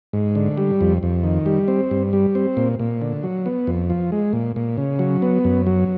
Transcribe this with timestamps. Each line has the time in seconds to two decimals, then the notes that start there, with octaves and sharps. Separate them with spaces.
0.13 G#2
0.35 D3
0.58 G3
0.81 F2
1.03 F2
1.24 D#3
1.46 G3
1.68 C4
1.91 G2
2.13 G3
2.35 C4
2.57 A#2
2.79 A#2
3.02 D3
3.23 F#3
3.46 B3
3.67 F2
3.90 F3
4.12 G#3
4.33 A#2
4.56 A#2
4.77 C#3
4.99 F#3
5.22 B3
5.45 F#2
5.67 F#3